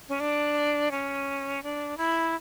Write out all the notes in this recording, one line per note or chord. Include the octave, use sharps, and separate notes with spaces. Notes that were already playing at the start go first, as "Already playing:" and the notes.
C#4
D4
C#4
D4
E4